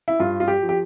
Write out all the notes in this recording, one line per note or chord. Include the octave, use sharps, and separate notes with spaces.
E4
G2 F4
F4
G4
F3
G4